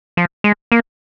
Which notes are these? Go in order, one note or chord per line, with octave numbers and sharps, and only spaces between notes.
F3
G#3
A#3